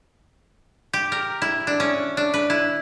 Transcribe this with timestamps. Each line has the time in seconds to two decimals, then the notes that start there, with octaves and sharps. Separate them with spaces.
0.93 G4
1.12 A#4
1.42 E4
1.67 D4
1.80 C#4
2.17 D4
2.34 B4
2.50 E4